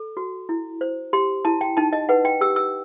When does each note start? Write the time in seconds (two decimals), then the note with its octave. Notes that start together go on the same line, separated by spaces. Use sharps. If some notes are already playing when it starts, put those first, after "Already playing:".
Already playing: A4
0.17 F#4
0.49 E4
0.81 C5
1.13 G4 C6
1.45 E4 A5
1.61 G5
1.77 D#4 A5
1.93 D#5
2.09 B4 F#5
2.25 G5
2.41 G4 E6
2.56 E6